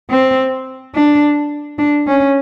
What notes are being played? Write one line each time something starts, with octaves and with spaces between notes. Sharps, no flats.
C4
D4
D4
C#4